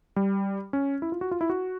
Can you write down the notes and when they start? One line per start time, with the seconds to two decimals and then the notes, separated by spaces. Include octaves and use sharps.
0.16 G3
0.73 C#4
1.02 E4
1.12 F4
1.21 F#4
1.31 F4
1.41 E4
1.50 F#4